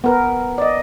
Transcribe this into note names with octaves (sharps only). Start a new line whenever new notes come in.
B3 A#4 B4
D5 D#5